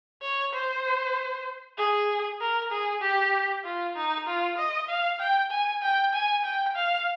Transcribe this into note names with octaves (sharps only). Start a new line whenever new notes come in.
C#5
C5
G#4
A#4
G#4
G4
F4
D#4
F4
D#5
F5
G5
G#5
G5
G#5
G5
F5